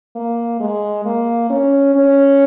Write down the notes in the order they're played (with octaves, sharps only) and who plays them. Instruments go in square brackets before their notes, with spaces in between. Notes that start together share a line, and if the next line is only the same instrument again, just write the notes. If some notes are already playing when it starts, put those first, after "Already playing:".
[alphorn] A#3
G#3
A#3
C#4
C#4